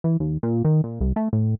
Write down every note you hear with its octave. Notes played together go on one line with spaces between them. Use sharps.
E3
D#2
A#2
D#3
A#2
C2
A3
A2